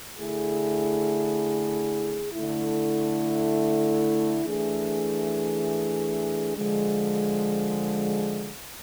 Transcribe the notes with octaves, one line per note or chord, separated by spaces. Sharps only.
D3 A3 E4 G#4
D3 A3 E4
E3 A3 D4 G#4
D3 F3 G#3